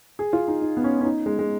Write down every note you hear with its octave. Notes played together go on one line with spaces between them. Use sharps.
G#4
F4
D#4
D#4
B3
C#4
C#4
D#4
G#3
G#3